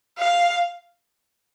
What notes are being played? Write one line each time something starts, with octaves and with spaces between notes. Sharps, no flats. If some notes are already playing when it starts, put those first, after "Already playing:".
F5